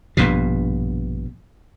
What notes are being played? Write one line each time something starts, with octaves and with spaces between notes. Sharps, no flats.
A#1 G2 B2